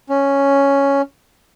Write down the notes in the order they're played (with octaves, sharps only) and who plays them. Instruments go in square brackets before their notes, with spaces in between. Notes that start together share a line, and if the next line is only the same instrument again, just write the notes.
[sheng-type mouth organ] C#4